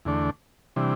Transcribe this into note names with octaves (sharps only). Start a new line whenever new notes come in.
E2 D3 A3 D4
C3 E3 G3 D4